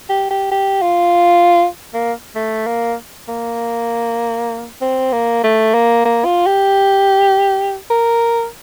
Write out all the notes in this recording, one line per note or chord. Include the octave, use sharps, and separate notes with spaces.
G4
G4
G4
F4
A#3
A3
A#3
A#3
C4
A#3
A3
A#3
A#3
F4
G4
A#4